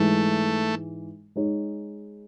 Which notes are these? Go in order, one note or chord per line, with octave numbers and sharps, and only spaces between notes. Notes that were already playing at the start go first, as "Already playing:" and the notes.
Already playing: G#2 E3 G#3 A3 D#4
G#3 D#4 G#4 C#5